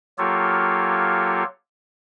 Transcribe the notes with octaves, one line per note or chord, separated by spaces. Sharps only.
F#3 A#3 F4 G4 A4 C#5